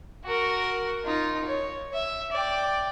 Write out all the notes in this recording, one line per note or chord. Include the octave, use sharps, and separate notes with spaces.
F#4 A#4
D#4 F4
C#5
E5
D5 G5